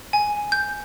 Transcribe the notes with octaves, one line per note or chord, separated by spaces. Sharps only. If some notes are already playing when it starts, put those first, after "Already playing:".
G#5
G6